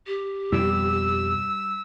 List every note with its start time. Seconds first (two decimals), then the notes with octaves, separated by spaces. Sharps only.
0.07 G4
0.52 F2 B2 G3 E6